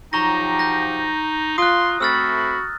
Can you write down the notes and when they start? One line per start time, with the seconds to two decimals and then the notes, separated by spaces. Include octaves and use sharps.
0.13 F3 F#3 D#4 G4 A#5 C#6 A#6
0.59 G6 A#6
1.58 F4 C6 D#6 F#6
2.00 A3 C4 F#4 B5 E6 F6 A6